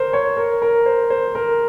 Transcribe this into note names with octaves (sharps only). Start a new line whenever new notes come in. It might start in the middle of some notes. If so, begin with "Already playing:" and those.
Already playing: A#4 C5
C#5
A#4
A#4
C5
C5
A#4